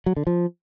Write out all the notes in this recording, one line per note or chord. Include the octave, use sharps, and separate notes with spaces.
F#3
D3
F3